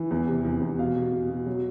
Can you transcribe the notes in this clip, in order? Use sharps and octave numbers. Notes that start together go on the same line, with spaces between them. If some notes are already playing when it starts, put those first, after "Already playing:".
Already playing: E3
E2
C3
E2
E2
B2 F5
B2
B2
B2
F#3